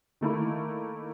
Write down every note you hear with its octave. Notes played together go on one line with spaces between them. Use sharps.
D#3 A3 A#3 E4